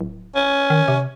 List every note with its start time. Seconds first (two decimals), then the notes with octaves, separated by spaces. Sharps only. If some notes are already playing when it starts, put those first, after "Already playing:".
0.01 D1
0.35 C#4
0.70 D#3
0.88 C3